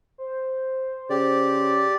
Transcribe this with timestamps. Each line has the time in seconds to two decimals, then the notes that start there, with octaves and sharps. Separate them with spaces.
0.18 C5
1.10 C#3 G4 D5